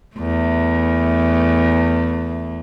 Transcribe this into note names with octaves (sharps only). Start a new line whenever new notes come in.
E2 A3